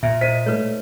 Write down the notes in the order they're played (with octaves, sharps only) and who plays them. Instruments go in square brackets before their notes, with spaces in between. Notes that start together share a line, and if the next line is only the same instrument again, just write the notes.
[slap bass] A#2 [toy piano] E5
[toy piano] C5 [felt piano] D#5 B6 D#7
[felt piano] A3 [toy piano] D#4 B4 C#5